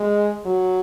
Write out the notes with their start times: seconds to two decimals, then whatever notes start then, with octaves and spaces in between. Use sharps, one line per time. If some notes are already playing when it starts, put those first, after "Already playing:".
Already playing: G#3
0.45 F#3